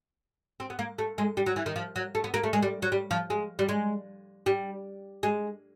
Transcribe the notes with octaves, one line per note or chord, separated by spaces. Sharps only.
C4
B3
A#3
A3
G#3
G3
F#3
E3
D#3
F3
F#3
A3
B3
A#3
A3
G#3
G3
F#3
G3
F3
G#3
G3
G#3
G3
G#3